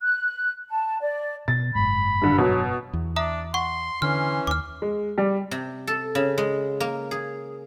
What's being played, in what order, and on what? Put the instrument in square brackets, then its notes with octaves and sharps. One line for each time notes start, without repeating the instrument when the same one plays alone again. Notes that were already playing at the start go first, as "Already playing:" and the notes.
[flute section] F#6
A5
D5
[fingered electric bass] B2 [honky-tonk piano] A6
[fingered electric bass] F#1 G#2 [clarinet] B5
[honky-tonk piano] G2 D3
[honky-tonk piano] B2 [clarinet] F#3
[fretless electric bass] E2
[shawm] D4 [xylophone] E5 A#5 D#6
[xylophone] F#5 C#6 [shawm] C6
[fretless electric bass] D3 [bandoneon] E3 C#4 [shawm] C6 [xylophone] F6
[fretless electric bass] D#2 [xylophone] D6 F6
[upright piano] G#3
G3
[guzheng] C3
A4
C#3
G#3
A#3
G#4